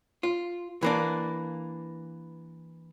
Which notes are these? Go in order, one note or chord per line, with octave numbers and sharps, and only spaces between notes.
F4
E3 A#3 D4